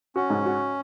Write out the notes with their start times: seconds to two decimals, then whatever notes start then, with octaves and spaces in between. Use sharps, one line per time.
0.15 C#4 F#4
0.30 G#2
0.46 F#4